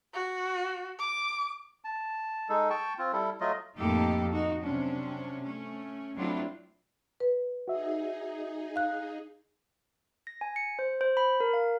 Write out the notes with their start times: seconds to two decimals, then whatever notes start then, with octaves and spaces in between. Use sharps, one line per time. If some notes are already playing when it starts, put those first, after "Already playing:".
0.14 F#4
0.99 D6
1.84 A5
2.49 G#3 D#4 A4
2.70 G5 A5 C#6
2.98 C4 F4
3.13 G3 E4 A4
3.40 F#3 A3 F4 D#5
3.78 F2 A2 A#3 D#4 G4 A4
4.32 D#4 F#4
4.62 C3 F#3 C#4 D4
5.44 A3 C#4
6.16 F#3 A3 C4 D4 E4 F4
7.20 B4
7.68 D#4 F#4 G#4 E5
8.76 F5 F#6
10.27 A#6
10.41 G#5
10.56 C#7
10.79 C5
11.01 C5
11.17 B5
11.40 A#4
11.54 F5